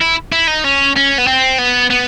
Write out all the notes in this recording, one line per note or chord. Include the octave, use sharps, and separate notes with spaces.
E4
E4
D#4
C#4
C#4
B3
C4
B3
B3